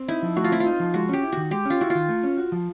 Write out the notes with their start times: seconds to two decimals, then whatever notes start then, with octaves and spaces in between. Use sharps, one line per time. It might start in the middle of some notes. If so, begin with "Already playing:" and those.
Already playing: C4
0.09 D#4 E4
0.23 F3
0.37 A3 F#4
0.44 F4
0.51 C4 E4
0.60 F4
0.66 D#4
0.80 F3
0.94 G#3 F#4
1.09 C#4 G4
1.23 E4
1.33 D#3 F#4
1.51 G#3 G4
1.65 C#4 F4
1.81 E4 F#4
1.90 D#3 F4
2.09 A3
2.24 C#4
2.37 F#4
2.52 F3